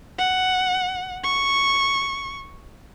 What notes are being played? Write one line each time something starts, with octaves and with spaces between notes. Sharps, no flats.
F#5
C#6